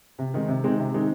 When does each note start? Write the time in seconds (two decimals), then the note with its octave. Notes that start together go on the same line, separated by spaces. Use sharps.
0.19 C3
0.34 D#3 G#3 C4 D#4
0.48 C3
0.64 D#3 G#3 C4 D#4
0.79 C3
0.94 D#3 G#3 C4 D#4